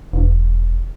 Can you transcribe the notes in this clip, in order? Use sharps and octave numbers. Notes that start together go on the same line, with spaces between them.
E1